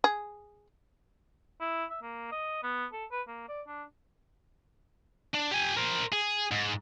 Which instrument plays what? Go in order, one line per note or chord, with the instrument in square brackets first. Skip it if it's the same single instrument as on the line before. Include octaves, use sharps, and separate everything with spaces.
[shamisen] G#4
[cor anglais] E4
E5
A#3
D#5
B3
A4
B4
A#3
D5
D4
[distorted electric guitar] D4
G4 G#5
A#4 C5
G#4
G#2